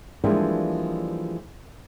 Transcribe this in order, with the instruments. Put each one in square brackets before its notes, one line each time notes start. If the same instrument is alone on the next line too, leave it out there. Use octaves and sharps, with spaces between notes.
[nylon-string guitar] E3 F3 G3 G#3 A#3 D4